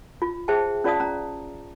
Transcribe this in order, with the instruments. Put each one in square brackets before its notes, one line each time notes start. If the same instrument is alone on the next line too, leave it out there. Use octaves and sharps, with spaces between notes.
[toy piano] F4
G#4 C5 E5 G5 A5
C#4 F4 D5 F5 A5 D#6
C#4 A#5